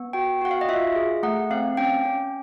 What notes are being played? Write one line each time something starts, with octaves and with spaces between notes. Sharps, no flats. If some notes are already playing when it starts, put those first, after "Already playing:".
Already playing: B3
F#4 G5
F#4 F#5
F5
D#5
F4 E5
G#4
A3 F#5
C4 F5
C#4 G5
C#4